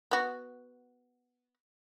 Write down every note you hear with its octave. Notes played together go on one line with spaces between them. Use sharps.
B3 F#4